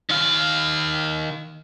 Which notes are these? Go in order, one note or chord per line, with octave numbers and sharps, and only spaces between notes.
D#3 F5